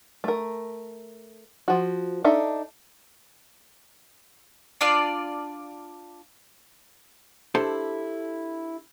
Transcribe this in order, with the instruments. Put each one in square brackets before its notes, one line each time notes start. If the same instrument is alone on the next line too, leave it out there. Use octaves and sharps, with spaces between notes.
[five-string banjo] A3 A#4
F3 F#4
D4 D#4 A4 E5
[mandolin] D4 F4 D5
[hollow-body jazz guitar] D4 E4 G4 A4 C5 A5